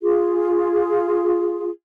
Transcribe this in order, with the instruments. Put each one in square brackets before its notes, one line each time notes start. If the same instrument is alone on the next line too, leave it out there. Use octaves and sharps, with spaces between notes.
[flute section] F4 G#4